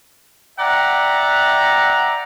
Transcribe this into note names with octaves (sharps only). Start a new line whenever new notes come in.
D5 E5 F#5 G5 A#5